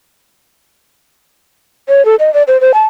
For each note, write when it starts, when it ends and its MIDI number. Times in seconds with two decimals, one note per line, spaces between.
1.89 2.04 73
2.05 2.15 69
2.20 2.32 75
2.34 2.43 74
2.48 2.59 72
2.61 2.74 72
2.74 2.86 81